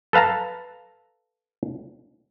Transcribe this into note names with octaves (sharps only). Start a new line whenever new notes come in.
A4 B4 F5 A5 A#5